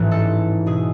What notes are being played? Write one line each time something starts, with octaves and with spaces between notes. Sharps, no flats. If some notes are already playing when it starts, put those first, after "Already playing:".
Already playing: A1 G#2 E3 B4
A4
B2 G#4